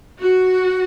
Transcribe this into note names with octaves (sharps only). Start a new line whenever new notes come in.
F#4